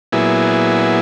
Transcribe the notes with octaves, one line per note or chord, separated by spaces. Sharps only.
A#2 F#3 B3 E4 G#4